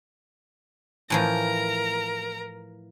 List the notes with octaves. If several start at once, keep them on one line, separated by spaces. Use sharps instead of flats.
A2 E3 F3 A#4 A#5